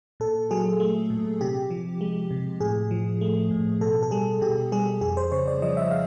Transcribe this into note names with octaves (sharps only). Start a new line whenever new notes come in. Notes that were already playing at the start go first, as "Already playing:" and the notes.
A#2 A4
F#3 G#4
A3
A#2
C3 G4
F3
G#3
C3
A2 G#4
F3
A3
A2
B2 A4
A4
G3 G#4
B2 G4
G3 G#4
F2 G#4
C5
C#3 C#5
D5
F3 D#5
E5
F5